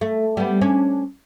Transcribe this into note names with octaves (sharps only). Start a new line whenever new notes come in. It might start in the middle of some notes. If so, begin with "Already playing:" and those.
A3
G3 B3
C#4 D4